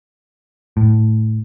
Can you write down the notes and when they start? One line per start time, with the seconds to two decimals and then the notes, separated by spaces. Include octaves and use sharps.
0.77 A2